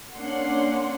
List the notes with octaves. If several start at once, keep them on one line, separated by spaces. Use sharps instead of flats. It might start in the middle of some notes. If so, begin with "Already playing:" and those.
A#3 C#4 D4 F#5 C6